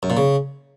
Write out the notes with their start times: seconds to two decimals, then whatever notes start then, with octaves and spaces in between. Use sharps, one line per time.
0.03 F#2
0.10 A#2
0.17 C#3